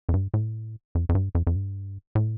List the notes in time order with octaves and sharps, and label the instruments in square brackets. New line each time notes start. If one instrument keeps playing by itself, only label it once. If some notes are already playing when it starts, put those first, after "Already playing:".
[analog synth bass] F2
G2
A2
F2
F2
G2
F2
F2
G2
A2